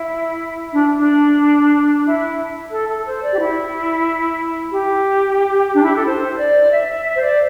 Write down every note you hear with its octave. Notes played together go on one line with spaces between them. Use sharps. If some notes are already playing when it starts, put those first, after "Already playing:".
Already playing: E4
D4
D4
E4
A4
A4
C5
D5
G4
E4
G4
D4
E4
G4
A4
C5
D5
E5
E5
E5
C5
D5